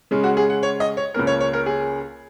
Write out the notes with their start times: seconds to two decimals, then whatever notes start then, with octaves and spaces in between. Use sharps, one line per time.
0.11 C#3 G#3 C#4
0.24 F#4
0.37 G#4
0.50 F#5
0.63 C#5
0.80 D#5
0.97 C#5
1.14 C#2 C#3 A#3 C#4 A#4
1.27 C#5
1.40 C#5
1.53 A#4
1.66 G#4